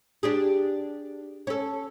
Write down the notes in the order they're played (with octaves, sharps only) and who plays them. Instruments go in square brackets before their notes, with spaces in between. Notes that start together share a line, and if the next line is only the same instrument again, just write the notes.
[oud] D4 G4 G#4
C#4 A4